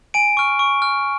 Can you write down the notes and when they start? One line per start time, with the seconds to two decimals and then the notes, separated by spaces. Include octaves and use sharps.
0.14 G#5 D7
0.37 C#6 F6
0.59 C#6
0.82 F6